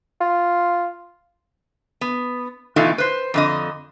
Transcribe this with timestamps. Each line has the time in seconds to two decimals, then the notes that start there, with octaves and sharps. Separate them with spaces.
0.21 F4
2.01 B3
2.76 B2 E3 A3 D#4 F4
2.98 B4 C5
3.34 F2 D3 D#5